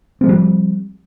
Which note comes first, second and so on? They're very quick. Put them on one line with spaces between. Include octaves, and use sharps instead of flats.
C4 G#3 F3 G3